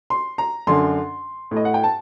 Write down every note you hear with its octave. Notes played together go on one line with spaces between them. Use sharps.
C6
A#5
F#2 D3 C6
A2
D#5
F#5
G5
A5